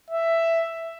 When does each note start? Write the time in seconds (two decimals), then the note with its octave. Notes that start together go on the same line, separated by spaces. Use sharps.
0.10 E5